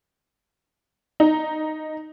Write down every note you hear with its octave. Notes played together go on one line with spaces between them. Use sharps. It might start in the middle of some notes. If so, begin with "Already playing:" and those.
D#4